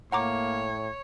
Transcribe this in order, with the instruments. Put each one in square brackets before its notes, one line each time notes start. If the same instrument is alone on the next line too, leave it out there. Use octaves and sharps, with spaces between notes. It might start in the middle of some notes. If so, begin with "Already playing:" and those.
[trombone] A2 [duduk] A#3 [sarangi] C#5 [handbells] F#5 A#5 D6